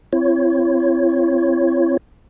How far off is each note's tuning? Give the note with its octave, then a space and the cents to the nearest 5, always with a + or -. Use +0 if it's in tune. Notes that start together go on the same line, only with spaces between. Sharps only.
C4 +0 E4 +45 C#5 +0